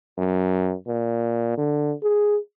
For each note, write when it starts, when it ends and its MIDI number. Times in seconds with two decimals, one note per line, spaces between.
0.18 0.74 42
0.87 1.56 46
1.57 1.94 50
2.03 2.38 68